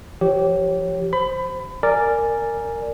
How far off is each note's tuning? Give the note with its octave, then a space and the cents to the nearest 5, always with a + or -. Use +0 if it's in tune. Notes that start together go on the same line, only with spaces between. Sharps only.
F3 -40 G4 -15 C#5 +0
C5 +0 B5 +25
A#4 -15 D5 +0 G#5 -5